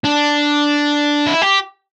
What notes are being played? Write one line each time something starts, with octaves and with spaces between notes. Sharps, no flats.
D4
E4
G4